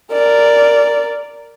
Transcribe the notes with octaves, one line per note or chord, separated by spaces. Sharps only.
A#4 D5